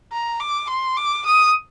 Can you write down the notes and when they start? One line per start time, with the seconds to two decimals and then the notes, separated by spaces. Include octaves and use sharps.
0.12 A#5
0.40 D6
0.70 C6
0.97 D6
1.26 D#6